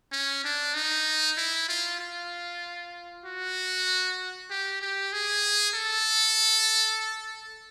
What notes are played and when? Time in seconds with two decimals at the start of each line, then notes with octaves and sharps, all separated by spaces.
0.12 C#4
0.44 D4
0.74 D#4
1.37 E4
1.69 F4
2.00 F4
3.24 F#4
4.50 G4
4.81 G4
5.13 G#4
5.75 A4